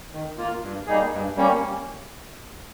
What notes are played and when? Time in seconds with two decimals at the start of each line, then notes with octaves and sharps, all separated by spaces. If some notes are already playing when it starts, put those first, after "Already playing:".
0.13 D#3
0.38 A#3 F4
0.63 G2
0.87 G3 A#3 D#4 G#4
1.12 G2
1.36 G3 A#3 C#4